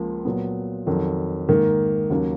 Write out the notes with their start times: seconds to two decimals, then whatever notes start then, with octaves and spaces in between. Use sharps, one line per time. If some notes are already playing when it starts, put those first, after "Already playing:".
Already playing: C#2 F3 A#3
0.25 A#2 F#3 B3
0.87 F2 D#3 F#3
1.48 G#2 D#3 A#3
2.10 D#2 C#3 F#3 A#3